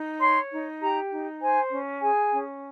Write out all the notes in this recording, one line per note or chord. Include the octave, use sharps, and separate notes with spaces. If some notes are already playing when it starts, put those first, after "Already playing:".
Already playing: D#4
C#5 C6
D#4
G4 A#5
D#4
C5 G#5
C#4
G#4 G#5
C#4